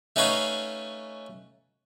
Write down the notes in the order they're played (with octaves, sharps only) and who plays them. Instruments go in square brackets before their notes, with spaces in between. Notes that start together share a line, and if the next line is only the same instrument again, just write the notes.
[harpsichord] A3 C#4 D#4 B4 C#5 F5